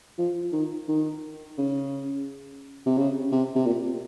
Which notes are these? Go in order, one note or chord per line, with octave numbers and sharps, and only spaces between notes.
F3
D#3
D#3
C#3
C3
C#3
C3
C3
A#2